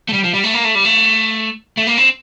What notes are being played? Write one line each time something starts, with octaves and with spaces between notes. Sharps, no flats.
A3
G3
F3
G3
A3
A#3
A3
G3
A3
A3
A#3
C4